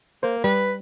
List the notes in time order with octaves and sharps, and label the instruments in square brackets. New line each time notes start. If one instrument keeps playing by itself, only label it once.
[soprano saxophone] A#3 [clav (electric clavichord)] C5
[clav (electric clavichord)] G3 [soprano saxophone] B4